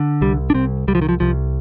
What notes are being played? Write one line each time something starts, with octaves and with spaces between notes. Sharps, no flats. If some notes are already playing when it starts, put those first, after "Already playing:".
Already playing: D3
C2 G3
D4
C2 C4
C2 G3
F3
D#3
F3
C2 F3